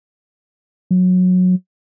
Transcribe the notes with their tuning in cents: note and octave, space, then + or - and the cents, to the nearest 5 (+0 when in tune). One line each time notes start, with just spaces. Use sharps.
F#3 -20